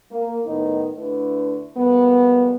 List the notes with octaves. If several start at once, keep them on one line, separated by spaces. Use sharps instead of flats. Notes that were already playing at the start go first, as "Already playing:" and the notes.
A#3
A2 D#3 B3 D#4
D3 A3 D4 E4 B4
F2 A#2 G3 B3